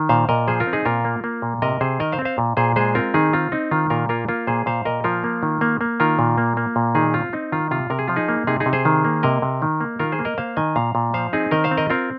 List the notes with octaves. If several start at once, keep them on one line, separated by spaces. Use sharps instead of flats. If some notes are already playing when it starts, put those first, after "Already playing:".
Already playing: D#3
A#2 C5 F5
A#2 A#4 D#5
F3 G#4 C5
F4 A#4
C4
D#4 G#4
A#2 F4 A#4
A#3
A#3
A#2
C3 A#4 D#5
C3 G#4 C5
D#3 A#4 D#5
C5 F5
C4
C5 F5
A#2
A#2 G#4 C5
G#3 G#4 C5
C4 F4 A#4
D#3 D#4 G#4
C4 F4
C4 D#4
D#3 F4
A#2 F4 A#4
A#3 F4 A#4
A#3 F4 A#4
A#2 G#4 C5
A#2 C5 F5
A#2 A#4 D#5
F3 F4 A#4
A#3
D#3
A#3
A#3
D#3 F4 A#4
A#2
A#3
A#3
A#2
D#3 D#4 G#4
C4 F4
C4 D#4
D#3 F4
C3 F4
C3 A#4
G#4
F3 F4
D#4 G#4
A#3
C3 D#4 G#4
D#4 G#4
C3
G#4 C5
D#3
A#3
C3 A#4 D#5
C3
D#3
A#3
D#3 F4 A#4
G#4 C5
A#3
A#4 D#5
A#3 C5 F5
D#3 D#5 G#5
A#2 F5 A#5
A#2
F3 C5 F5
C4 D#4 G#4
D#3 A#4 D#5
C5 F5
C4
A#4 D#5
C4 F4 A#4